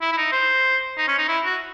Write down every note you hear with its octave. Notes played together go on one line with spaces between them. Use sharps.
E4
E4
D#4
C5
D#4
C#4
D#4
E4
F#4